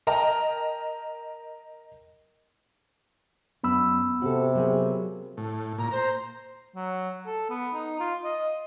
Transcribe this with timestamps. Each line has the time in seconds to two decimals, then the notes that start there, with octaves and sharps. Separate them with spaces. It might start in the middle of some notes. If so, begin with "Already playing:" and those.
0.07 A#4 D#5 G5 A5 A#5
3.64 F#2 B3 D4 B5 E6
4.22 C3 F#4 A4
4.55 F#3 A#3 G#4
5.37 A2
5.78 A#2 A#5
5.91 C5 A#5
6.75 F#3
7.26 A4
7.50 B3
7.74 D#4
8.00 F4
8.24 D#5